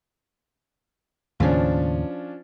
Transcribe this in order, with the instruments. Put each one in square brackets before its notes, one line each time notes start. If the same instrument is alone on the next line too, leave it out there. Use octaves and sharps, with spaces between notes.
[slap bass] D#2 A2 C#3 [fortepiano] F3 C#4 D4